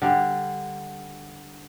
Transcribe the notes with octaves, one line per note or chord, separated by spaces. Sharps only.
D3 G3